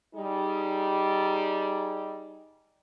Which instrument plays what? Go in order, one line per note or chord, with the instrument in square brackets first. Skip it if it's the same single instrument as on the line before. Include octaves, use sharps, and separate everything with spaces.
[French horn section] G3 D#4 G#4